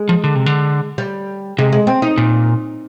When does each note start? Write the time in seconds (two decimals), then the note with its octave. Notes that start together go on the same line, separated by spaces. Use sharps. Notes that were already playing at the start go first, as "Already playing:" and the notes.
Already playing: G#3
0.09 F3
0.24 D3
0.35 C3
0.46 D3
0.98 G3
1.58 C3 G#3
1.73 G#3
1.87 C4
2.02 D#4
2.18 A#2